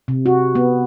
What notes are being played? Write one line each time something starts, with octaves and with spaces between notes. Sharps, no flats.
C3
F#4
B3